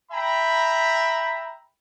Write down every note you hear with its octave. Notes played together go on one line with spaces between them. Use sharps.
E5 G5 A#5 B5